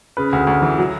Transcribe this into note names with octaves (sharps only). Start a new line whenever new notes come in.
C#3 B4
D2
D2
E3
F#3